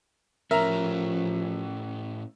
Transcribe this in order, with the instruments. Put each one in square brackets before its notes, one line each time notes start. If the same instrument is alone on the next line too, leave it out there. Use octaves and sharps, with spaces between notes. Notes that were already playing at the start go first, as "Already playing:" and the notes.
[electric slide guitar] A2 C#4 [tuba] F3 [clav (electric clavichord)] A#4 [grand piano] E5 A#5